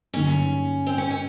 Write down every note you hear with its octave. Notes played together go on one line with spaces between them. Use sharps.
G2 D3 F#3 A#3 C#4 D#4
C4
C#4
C#4